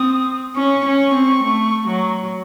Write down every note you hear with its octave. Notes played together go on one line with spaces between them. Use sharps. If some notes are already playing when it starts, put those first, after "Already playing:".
Already playing: C4 D#6
C#4 C#6
C#4
C4
A3
F#3